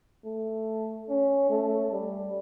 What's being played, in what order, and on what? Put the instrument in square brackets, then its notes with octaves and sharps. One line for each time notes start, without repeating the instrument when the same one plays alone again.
[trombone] A3
C#4
A3
G3